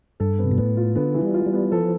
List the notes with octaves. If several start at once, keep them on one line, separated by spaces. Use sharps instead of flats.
G2 A4
B3
C3
B2
A2 B3
F4
D3 B3
E3
G3
F4
G3
B3
F3 A4